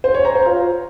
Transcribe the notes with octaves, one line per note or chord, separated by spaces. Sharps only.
C5
C#5
A#5
C5
F4